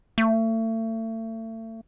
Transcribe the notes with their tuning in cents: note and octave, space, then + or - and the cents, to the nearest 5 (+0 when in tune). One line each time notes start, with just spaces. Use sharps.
A3 +35